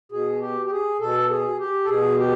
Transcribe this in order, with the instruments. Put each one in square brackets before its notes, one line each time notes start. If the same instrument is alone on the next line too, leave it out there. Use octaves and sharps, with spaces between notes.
[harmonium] B2 G#4
G4
G4
G#4
B2 A4
G#4
G4
A4
B2 G#4
G4